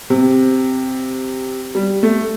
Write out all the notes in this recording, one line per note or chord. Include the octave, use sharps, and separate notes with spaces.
C3
G3
A3